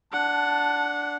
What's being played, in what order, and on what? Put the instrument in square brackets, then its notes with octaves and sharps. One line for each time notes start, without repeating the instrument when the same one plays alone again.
[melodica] D4 [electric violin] F#5 [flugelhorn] A5